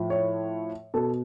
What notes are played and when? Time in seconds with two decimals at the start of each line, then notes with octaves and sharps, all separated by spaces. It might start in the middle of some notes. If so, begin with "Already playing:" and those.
Already playing: A2 F3
0.10 C#5
0.94 B2 A4